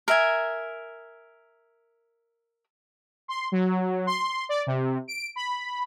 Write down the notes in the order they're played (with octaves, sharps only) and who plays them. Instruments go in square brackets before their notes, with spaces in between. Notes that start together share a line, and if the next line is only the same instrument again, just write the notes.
[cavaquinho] A#4 E5 G#5
[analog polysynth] C6
F#3
C6
D5
C3
D7
B5